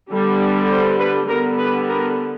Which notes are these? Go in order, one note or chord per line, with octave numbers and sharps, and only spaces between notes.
D3 G3 B3
C5
B4
D3 G3 B3 A#4
B4
A#4